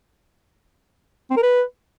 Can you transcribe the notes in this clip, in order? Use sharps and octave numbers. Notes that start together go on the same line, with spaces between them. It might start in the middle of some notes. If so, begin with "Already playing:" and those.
C4
A#4
B4